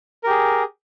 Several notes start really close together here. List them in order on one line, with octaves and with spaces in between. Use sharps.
A#4 G4 G#4